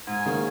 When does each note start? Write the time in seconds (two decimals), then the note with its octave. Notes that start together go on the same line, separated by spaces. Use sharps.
0.07 G#2 G#5
0.26 D#3 A#3 C#4 G#4